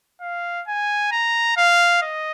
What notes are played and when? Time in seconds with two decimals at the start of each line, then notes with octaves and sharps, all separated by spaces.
0.21 F5
0.67 G#5
1.12 A#5
1.57 F5
2.02 D#5